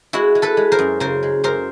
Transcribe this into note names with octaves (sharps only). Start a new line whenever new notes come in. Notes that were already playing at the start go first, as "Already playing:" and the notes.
G#3 E4 F#4
G#3
A4 B4
G#3
A#4 C5
F#2
C#3 A#4 C5
G#3
F#2 A#4 C5